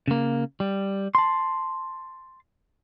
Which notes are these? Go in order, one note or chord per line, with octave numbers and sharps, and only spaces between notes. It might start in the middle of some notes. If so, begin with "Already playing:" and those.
C#3 A#3
G3
A5 C6